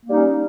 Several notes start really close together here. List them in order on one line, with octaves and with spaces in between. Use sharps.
A#3 G3 D#4 C#4